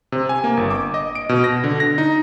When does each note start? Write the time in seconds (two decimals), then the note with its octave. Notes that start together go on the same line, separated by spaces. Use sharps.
0.12 C3
0.29 G#5
0.44 A#3
0.57 G1
0.70 D6
0.94 D#5
1.15 D7
1.29 B2
1.44 A#6
1.64 D3
1.80 A#6
1.98 D#4